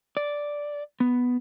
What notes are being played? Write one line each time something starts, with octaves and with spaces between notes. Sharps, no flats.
D5
B3